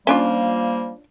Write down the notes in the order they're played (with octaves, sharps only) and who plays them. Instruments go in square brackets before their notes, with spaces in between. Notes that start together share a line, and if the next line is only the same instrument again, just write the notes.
[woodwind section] F3 G3 A#3 [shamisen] C#4 D4 F4